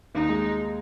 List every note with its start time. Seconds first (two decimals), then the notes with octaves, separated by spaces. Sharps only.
0.14 D#2 D#4
0.29 G#3